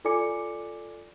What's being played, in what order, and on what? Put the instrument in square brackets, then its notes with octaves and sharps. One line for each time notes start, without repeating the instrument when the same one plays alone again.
[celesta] F4 A4 D5 G#5 D6 C#7